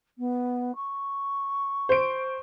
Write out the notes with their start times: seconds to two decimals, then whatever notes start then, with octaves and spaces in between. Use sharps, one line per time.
0.18 B3
0.75 C#6
1.89 C5 D7